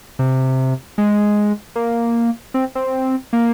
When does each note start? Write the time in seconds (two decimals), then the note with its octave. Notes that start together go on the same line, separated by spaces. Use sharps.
0.19 C3
0.98 G#3
1.76 A#3
2.54 C4
2.75 C4
3.33 A#3